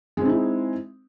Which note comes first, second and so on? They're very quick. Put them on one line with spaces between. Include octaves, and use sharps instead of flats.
G#3 C4 D#4 E4